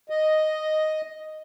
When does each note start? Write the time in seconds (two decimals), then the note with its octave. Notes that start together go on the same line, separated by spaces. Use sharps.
0.10 D#5